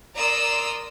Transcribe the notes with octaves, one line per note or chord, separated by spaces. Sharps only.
A#4 D5 A#5 C6 D#6 E6